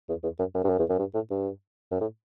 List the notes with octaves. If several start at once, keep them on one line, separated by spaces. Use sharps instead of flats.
E2
E2
F#2
F#2
G2
F#2
E2
F#2
G2
A2
G2
F#2
A2